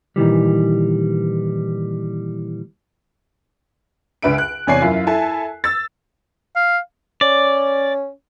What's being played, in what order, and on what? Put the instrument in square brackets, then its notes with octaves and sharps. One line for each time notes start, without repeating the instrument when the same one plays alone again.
[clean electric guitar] A#2 D#3 E3 G3
[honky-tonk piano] C#2 D4 B4 E5 D7
F#6
E2 C3 C#5 D5 G#5 C7
F#2 E4 F4
E4 A4 G#5 A5
E6 A6
[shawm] F5
[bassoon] C#4 [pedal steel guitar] D5